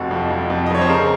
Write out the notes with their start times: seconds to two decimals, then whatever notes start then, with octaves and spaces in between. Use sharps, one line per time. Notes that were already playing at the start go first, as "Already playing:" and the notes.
Already playing: F1 F2 F#4
0.11 F2
0.30 F2
0.50 F2
0.66 D#5
0.70 F2 C#5
0.81 C5
0.89 C#3 A#4